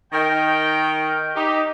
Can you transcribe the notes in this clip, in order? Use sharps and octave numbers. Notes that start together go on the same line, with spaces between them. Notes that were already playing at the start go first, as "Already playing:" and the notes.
D#3 A#4 D#5 G5
D#4 G4